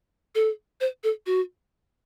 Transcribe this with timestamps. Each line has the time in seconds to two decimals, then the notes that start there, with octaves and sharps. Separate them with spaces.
0.35 A4
0.81 C5
1.04 A4
1.26 F#4